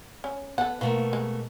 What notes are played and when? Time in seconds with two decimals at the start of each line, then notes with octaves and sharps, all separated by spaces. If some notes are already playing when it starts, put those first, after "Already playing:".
0.24 C#4
0.58 B3 A4 F#5
0.81 B2 A3 A#3 F4
1.13 G#3